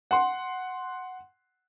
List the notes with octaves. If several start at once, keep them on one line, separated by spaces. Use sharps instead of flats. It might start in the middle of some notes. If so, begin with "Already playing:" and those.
F#5 C6